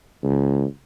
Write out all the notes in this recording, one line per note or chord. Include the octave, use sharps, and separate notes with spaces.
C#2